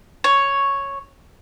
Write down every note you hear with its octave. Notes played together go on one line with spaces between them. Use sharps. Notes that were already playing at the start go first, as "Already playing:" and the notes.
C#5